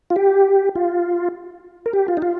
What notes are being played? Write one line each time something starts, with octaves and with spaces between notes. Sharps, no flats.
F4
G4
F4
A#4
G4
F4
D#4
F4